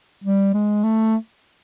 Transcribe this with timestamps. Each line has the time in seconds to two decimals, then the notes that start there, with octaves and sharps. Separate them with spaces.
0.24 G3
0.54 G#3
0.83 A3